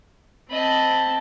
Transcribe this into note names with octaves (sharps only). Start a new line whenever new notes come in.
C4 D#5 A5 B5